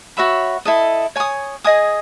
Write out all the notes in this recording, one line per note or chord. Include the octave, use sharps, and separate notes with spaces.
F#4 C#5 E5 B5
E4 A4 D#5
C#5 G#5 D#6
G#4 D#5 G#5 D#6